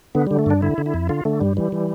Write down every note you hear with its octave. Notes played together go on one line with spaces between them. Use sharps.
D3 B3
D3 G3
A3
G2 D4
D3 E4
D3
E4
F2
D3 F4
D3 A3
G2 G3
E3 G3
E3